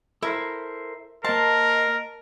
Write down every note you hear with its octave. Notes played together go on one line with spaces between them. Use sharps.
E4 A4 A#4 C5
A#3 A#4 C5 D#5 A5